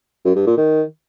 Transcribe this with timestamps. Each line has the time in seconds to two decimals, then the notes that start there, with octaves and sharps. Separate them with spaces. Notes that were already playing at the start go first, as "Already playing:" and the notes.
0.25 F#2
0.36 G2
0.46 A#2
0.57 D#3